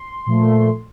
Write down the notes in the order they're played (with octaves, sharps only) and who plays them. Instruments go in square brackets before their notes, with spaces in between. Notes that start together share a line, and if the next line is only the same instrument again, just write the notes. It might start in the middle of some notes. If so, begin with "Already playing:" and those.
Already playing: [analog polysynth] C6
A#2 F3 A3